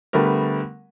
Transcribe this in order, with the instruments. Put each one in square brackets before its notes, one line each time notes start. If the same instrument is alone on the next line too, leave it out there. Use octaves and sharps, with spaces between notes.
[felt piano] D3 G3 A3 B3 A#4